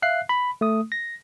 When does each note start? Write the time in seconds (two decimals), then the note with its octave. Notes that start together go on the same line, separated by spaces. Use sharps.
0.02 E5 F5 F#6 C7
0.29 B5
0.61 A3 D#6
0.92 A#6